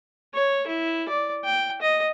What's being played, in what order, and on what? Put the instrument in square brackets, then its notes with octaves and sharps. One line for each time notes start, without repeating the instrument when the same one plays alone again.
[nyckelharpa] C#5
E4
D5
G5
D#5